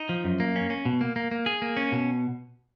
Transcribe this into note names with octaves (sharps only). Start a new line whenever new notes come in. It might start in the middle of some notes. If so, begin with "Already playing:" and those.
Already playing: D#4
F3
F#2
A#3
C#4
C#4
B2
A#3
A#3
A#3
G#4
A#3
C#4
B2